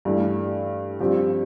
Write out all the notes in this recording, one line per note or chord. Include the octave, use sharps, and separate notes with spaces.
G2 E3 A3
G2 F3 C4 G4